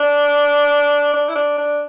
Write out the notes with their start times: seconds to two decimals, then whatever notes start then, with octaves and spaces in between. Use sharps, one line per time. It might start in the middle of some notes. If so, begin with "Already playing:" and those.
Already playing: D4
1.13 D4
1.28 E4
1.35 D4
1.58 D4